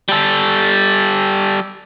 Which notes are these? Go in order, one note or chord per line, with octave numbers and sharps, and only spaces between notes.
G3 A4